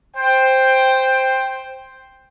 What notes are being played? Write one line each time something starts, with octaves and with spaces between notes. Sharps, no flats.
C5 G5